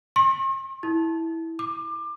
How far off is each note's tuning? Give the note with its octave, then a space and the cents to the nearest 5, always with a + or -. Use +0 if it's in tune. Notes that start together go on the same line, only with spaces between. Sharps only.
C6 +45
E4 -10
D6 +25